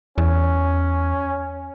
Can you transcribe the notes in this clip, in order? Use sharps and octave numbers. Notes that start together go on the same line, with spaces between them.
E2 C#4